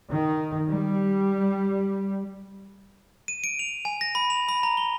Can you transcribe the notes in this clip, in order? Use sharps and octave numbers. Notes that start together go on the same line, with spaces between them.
D#3
G3
D#7
D7
F7
G#5
A#6
B5
F7
B5
A#5
G7